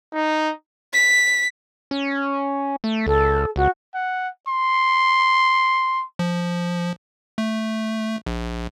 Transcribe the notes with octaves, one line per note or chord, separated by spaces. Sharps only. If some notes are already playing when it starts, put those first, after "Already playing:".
D#4
B6
C#4
A3
C#2 A4
C#2 F#4
F#5
C6
F3
A3
A#1